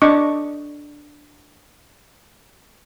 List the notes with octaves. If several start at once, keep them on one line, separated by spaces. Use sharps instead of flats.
D4 D#5 C#6 D6